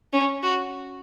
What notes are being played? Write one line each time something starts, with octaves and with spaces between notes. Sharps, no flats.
C#4
F#4